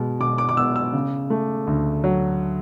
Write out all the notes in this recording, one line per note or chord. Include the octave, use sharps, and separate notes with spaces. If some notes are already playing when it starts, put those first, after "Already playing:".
Already playing: B2 G#3
B2 D6
D6
D6
B3 E6
E6
C#3
A3
D2
F#3